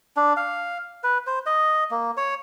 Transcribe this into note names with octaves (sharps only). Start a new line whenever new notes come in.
D4
F5
B4
C5
D#5
A#3
C#5